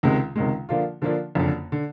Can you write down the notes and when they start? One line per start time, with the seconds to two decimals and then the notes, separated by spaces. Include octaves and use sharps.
0.03 C#2 C3 D#3 G#3
0.36 C#2 C3 D#3 G#3
0.69 D3 F3 A#3 D4 F4
1.02 D3 F3 A#3 D4 F4
1.35 F#1 F2 D3
1.72 D3